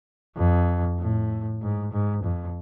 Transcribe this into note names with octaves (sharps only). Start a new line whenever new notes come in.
F2
A2
G#2
G#2
F2